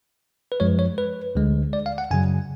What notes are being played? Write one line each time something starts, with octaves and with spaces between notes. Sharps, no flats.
B4
F#2 F3 G#3 C#5
C#5
B4
D2 D3 G#3
D5
F5
F#5
F#2 C#3 F#3 G#5